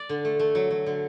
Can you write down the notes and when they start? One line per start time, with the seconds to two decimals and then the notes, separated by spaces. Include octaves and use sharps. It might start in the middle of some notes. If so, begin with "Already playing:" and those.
Already playing: D5
0.09 D3
0.25 A3
0.39 A3
0.55 F#3
0.70 F#3
0.86 D3